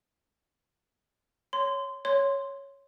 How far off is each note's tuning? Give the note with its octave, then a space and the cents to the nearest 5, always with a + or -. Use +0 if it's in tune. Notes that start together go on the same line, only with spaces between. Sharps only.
C#5 +0 C6 -20
C#5 +0 C6 +0